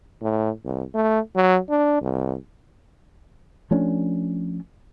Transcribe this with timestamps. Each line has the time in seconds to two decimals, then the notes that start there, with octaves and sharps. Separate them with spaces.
0.21 A2
0.65 C2
0.95 A3
1.35 F#3
1.69 D4
2.02 C2
3.71 F3 A3 C#4 D4